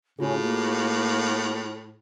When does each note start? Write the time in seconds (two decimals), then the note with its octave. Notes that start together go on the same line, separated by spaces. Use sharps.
0.19 A2 C#3 F4 F#4 G#4
0.43 A#3